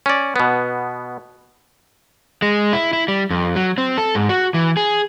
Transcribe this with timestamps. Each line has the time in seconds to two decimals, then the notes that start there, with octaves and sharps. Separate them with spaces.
0.06 C#4 D5
0.36 B2 B3
2.42 G#3
2.73 E4
2.93 E4
3.08 G3
3.30 F2
3.56 F#3
3.78 C4
3.98 A4
4.15 G#2
4.29 F#4
4.54 E3
4.77 G#4